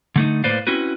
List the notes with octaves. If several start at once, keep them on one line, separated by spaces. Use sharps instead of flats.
D3 A3 D#4
A2 A#3 B4 C5 D5 F5
C4 C#4 E4 F#4 B4